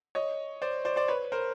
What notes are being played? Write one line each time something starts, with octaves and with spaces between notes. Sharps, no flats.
C#5 D#5
C5 D5
C5 D5
C5 D5
B4 C#5
A#4 C5